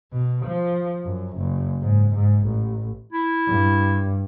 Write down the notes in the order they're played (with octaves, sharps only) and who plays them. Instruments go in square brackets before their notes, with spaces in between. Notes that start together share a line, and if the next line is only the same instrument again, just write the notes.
[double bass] B2
F3
F#2
F#1
G#2
G#2
A1
[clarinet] E4
[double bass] G2